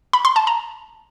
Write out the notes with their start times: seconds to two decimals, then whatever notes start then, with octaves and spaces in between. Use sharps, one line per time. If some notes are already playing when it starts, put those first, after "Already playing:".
0.13 B5
0.25 C6
0.36 A5
0.47 A#5